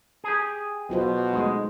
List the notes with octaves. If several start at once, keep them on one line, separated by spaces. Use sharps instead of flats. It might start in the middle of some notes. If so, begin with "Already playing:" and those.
G4 G#4
B2 F#3 F4 C5
G#3 A3 D#4